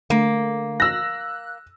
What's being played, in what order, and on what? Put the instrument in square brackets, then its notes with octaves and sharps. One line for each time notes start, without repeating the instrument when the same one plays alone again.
[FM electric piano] D3 A3 [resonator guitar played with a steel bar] A#3
[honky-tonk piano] E6 A#6 [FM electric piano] F#6